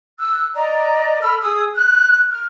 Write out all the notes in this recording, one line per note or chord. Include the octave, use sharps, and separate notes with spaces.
E6 F#6
D5 D#5 A#5
A4 B5 E6 F6
G#4 D#6 E6
F#6
F6